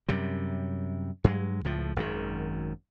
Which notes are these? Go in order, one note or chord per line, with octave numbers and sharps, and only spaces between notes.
F#2 C3 G3
G2 F#3 G#3
C#2 A2 F3
G#1 F#2 D3 D#3